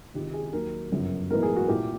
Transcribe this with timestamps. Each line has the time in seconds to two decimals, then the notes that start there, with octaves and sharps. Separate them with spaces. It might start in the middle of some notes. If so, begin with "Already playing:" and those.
0.14 C#2 C3 D#3 G#3 G4
0.33 G#4
0.53 D#2 D#3 F#3 A#4
0.91 G1 F#2 C#3 F#3
1.30 B1 A2 E3 G#3 B3 A#4
1.43 G#4
1.56 F#4
1.68 C2 A#2 G3 A#3 G4